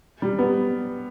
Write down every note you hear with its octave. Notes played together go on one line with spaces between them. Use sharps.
G3
B3